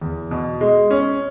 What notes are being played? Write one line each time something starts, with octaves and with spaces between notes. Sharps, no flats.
E2
B2
G#3
C#4